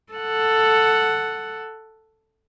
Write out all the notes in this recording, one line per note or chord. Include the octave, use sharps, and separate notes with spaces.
A4 F#5